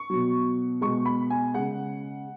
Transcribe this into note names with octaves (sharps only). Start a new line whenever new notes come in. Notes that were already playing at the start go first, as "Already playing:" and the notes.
Already playing: C#6
B2 F#3
B2 G#3 C#6
B5
G#5
C#3 G#3 F#5